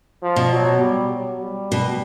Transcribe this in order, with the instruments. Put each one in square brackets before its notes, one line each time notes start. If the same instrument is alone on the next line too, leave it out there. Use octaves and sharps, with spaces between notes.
[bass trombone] F3
[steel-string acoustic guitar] B2
[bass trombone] F#3
G3
F#3
G3
[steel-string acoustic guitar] B2